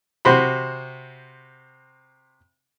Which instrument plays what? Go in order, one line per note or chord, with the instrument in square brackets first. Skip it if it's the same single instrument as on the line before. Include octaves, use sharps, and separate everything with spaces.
[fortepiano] C3 F#4 C5 B5